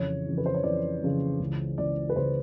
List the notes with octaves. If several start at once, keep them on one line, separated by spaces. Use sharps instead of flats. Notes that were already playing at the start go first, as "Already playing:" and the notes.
Already playing: F2 C#3 E3 C#5
F2 C#3 E3
B4
C5
C#5
F2 C#3 E3 D5
F2 C#3 E3
C#2 C#3 E3
C#2 C#3 E3 D5
B4
C#2 C#3 E3 C5